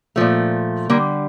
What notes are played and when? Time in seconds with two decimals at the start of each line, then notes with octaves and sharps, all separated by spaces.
0.16 A#2 F3 A3
0.90 D3 G3 A#3